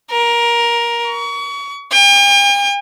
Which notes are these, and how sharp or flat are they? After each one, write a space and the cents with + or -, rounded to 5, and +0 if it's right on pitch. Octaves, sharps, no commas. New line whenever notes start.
A#4 +15
C#6 +35
G5 +45